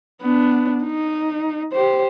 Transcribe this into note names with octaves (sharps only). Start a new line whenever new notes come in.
B3 D4
D#4
G4 C5